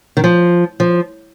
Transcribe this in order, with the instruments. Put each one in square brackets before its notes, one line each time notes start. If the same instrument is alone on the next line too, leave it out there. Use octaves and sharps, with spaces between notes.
[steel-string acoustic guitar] D#3
F3
F3